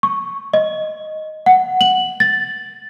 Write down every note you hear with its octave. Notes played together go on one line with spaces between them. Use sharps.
C#6
D#5
F#5
F#7
A6